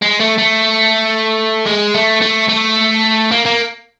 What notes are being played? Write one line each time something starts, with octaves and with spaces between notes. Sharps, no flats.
G#3
A3
A3
G#3
A3
A3
A3
A#3
A#3